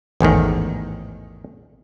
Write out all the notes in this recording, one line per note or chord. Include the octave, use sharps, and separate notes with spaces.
A1 E2 G#2 D#3